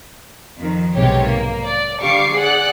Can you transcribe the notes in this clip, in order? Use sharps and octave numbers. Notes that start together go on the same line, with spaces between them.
F2 D#3
B1 G#2 C3 G4 C#5
A#3
D5
D3 G3 F5 C#6 D6 C7
G#4 D5 F#5 F#6